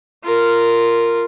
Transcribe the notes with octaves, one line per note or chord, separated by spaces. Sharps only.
F4 A#4